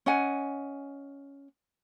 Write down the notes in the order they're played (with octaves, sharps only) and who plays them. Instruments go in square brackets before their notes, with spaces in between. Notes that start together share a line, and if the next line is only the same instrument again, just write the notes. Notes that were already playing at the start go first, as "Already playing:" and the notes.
[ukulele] C#4 D#5 F#5 G#5